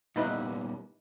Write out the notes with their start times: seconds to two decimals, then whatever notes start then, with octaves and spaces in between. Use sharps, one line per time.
0.16 A#2 G3 B3 D#4 E4 B4